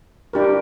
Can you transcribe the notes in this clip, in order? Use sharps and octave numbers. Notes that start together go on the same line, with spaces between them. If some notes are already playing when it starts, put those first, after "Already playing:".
D4 G4 A#4